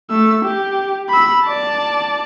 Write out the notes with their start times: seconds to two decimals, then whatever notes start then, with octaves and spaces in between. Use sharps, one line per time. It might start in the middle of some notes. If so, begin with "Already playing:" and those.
0.10 A3 E6
0.45 G4
1.09 B5 E6
1.44 D5 A5